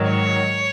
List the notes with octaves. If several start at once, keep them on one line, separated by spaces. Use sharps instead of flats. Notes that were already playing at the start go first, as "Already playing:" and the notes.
Already playing: G#2 D#3 F#3
C#5